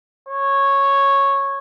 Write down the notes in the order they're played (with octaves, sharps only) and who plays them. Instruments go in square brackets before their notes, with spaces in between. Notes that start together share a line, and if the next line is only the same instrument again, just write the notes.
[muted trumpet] C#5